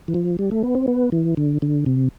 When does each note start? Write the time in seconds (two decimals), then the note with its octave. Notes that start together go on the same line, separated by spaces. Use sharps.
0.08 E3
0.14 F3
0.39 G3
0.51 A3
0.63 B3
0.75 C4
0.88 B3
1.12 E3
1.37 D3
1.62 D3
1.86 C3